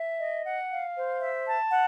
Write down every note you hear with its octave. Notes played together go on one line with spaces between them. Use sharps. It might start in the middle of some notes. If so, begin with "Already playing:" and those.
Already playing: E5
D#5
F#5
F5
C5
E5
A5
F#5